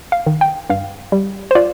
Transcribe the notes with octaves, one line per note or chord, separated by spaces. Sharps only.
F5
D#3
G5
G2 F5
G3
C5
F4 D5